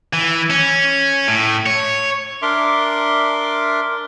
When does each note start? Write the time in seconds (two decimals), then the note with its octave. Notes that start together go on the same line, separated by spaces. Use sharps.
0.13 E3
0.50 C#4
1.28 A2
1.66 C#5
2.42 D4 A#4 E5 C6 D6